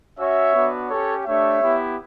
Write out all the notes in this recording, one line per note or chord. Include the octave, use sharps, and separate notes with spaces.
C#4 F#4 C#5 E5
B3 D4 F#4
C#4 G4 A4 C#5
A3 D4 G4 C#5 E5
B3 E4 G4